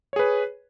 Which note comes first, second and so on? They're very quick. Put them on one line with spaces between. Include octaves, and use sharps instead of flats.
C#5 G#4 B4